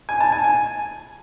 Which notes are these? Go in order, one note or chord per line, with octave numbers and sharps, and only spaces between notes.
G#5
A5
G#5
G#5